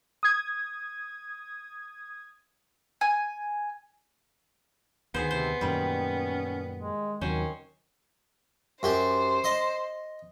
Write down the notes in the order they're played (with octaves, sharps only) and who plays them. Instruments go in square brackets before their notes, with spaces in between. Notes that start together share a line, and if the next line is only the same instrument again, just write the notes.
[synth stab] D#6 G#6
[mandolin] G#5
[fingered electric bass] D2 D#3 [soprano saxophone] B3 [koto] G#4 C5
[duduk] C3 [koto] C5
[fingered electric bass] F#2 A#2 [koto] D#3 G3 [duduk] C#4
[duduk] G#3
[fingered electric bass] D#2 C3 F#3 [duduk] D#3 [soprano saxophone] C#4 [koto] C5
[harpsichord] F#2 G4 [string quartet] C5
[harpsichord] D#5 C6